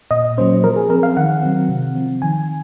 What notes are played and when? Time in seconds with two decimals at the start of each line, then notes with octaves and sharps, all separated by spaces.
0.11 A#2 D#5
0.38 F#3 A#3 C#4 C5
0.64 F3 A#4
0.76 G#4
0.90 C4 A#4
1.03 F5
1.17 D#3 F#5
1.42 F#3 C4
1.69 C3
1.95 F3 C4
2.22 D#3 G#5